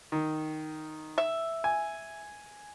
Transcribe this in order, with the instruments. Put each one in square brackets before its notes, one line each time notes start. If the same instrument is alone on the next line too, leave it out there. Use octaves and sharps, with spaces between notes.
[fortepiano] D#3
[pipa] E5
[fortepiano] G#5